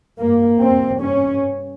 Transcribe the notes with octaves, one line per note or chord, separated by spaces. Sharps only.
G2 A#3
F2 C3 C4
G2 C#4